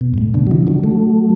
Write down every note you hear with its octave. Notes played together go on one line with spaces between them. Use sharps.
B2
G2
A2
B2 D3
F#3
C#3 E3
D3 F#3
F#3 A3